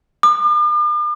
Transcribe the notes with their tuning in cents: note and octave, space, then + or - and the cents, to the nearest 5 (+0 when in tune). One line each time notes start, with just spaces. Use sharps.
D6 +45